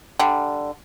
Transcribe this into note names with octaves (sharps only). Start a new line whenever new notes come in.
D3 G3